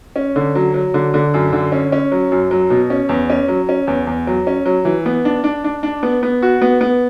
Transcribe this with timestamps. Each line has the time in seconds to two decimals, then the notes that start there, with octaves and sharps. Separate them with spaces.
0.16 C#4
0.36 D3
0.55 F#3
0.74 F#3
0.94 D3
1.14 D3
1.34 F#2
1.53 D3
1.72 C#4
1.92 C#4
2.12 F#3
2.32 F#2
2.51 F#3
2.70 B2
2.90 C#4
3.09 E2
3.30 C#4
3.48 F#3
3.69 C#4
3.87 E2
4.07 E2
4.27 F#3
4.47 C#4
4.66 F#3
4.85 E3
5.06 B3
5.25 D4
5.44 D4
5.64 D4
5.83 D4
6.03 B3
6.23 B3
6.42 F#4
6.62 B3
6.81 B3